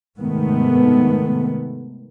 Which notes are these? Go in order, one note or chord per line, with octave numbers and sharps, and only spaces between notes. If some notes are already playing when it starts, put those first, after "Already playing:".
G#2 C3 D#3 A3 B3